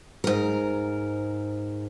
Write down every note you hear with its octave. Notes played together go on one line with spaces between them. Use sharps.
G#2 A#4